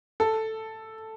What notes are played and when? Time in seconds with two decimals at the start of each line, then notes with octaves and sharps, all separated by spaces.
0.20 A4